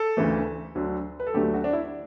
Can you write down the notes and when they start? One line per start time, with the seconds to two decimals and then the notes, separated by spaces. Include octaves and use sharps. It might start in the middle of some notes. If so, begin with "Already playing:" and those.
Already playing: A4
0.17 D2 C#3 E3 A3
0.75 D2 D3 F#3
1.20 B4
1.27 A4
1.34 D2 D3 F#3 A3 G4
1.54 F#4
1.64 D4
1.73 E4